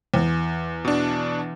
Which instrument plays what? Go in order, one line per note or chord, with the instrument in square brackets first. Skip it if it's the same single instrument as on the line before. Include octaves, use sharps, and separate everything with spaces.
[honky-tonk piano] E2
[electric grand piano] B2 D4